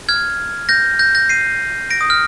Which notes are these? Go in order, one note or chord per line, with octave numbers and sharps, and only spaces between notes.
F6 G#6
G6 A#6
G6 A#6
G6 A#6
C7 D#7
A#6 D7
D#6
F6